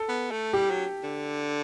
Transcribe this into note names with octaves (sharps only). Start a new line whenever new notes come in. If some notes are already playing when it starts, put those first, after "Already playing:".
Already playing: A4
B3
A3
G3 G4
F#3
D3